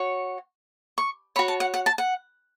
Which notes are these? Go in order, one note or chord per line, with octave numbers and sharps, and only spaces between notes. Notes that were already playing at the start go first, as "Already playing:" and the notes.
Already playing: F#4 C#5
C#6
F#4 C#5 B5
A5
F#5
F#5
A5
F#5